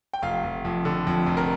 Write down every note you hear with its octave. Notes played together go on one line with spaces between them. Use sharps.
G5
F1 F5
F1
F2
D3
F2
F1
A#4